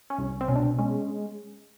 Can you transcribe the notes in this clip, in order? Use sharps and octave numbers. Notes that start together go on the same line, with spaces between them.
C#4
C2
C4
B2 C#4
D4
G#3 C#4